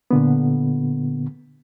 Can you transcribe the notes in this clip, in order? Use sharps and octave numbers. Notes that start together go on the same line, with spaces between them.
A#2 D3 B3